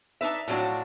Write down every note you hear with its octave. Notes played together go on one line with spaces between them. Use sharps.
D4 D#4 B4 E5
A2 F3 F#3 B3 D4 F#4